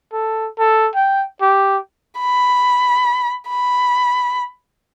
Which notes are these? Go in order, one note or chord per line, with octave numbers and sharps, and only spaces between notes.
A4
A4
G5
G4
B5
B5